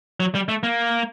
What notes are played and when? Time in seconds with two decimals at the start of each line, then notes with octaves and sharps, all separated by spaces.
0.20 F#3
0.35 G3
0.49 A3
0.63 A#3